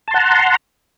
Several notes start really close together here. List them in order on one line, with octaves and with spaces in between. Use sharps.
A5 C6 F#5 A#5